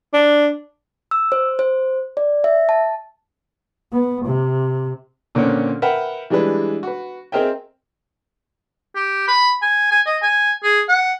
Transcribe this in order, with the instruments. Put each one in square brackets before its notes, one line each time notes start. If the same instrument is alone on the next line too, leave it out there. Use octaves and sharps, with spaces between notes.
[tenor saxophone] D4
[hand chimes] E6
C5
C5
D5
E5
A5
[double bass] B3
C3
[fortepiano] A#2 D3 A#3 C4 C#4
A#4 B4 E5 F#5 G5
E3 G3 G#3 D4 B4
F#4 B4
C4 G#4 A#4 D#5 E5 G5
[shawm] G4
B5
G#5
G#5
D#5
G#5
G#4
F#5